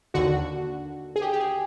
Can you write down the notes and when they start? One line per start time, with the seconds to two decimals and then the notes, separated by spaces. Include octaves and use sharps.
0.14 D#2 D3 F#4
1.16 G#4
1.21 G4
1.33 G4
1.40 G#4